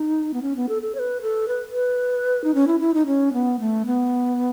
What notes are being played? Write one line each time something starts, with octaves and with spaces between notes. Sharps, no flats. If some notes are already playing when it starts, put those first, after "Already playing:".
Already playing: D#4
B3
C#4
B3
A4
A4
C#5
B4
A4
B4
B4
D#4
C#4
E4
E4
D#4
C#4
B3
A3
B3